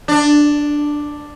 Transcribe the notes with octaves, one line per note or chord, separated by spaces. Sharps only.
D4